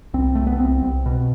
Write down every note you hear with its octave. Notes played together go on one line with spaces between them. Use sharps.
C2 C4
C2 A3
B3
C2 C4
C2
B2